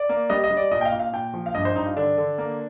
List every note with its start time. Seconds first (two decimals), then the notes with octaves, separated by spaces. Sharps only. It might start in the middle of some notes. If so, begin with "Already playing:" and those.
Already playing: D5
0.09 A#3
0.30 G3 D#5
0.44 D#5
0.51 G3
0.57 D5
0.71 A#2 D#5
0.81 G5
0.85 F5
0.92 A#2
0.99 F5
1.13 A#2 G5
1.34 F3
1.46 F5
1.55 G2 D#5
1.65 C5
1.76 G2 D#4
1.86 F4
1.97 D3 D4
2.17 D3
2.38 A#3